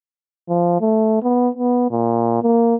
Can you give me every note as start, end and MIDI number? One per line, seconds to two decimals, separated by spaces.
0.49 0.81 53
0.81 1.22 57
1.22 1.49 59
1.55 1.90 59
1.91 2.38 46
2.42 2.75 58